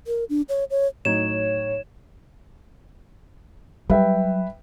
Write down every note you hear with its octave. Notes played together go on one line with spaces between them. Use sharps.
A#4
D4
C#5
C#5
A2 F#3 D#4 C#5 G#6 E7
F#3 G3 B4 E5 G5